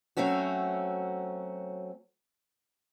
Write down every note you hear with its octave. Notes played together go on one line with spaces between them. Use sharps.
F#3 A3 C4 C#4 F#4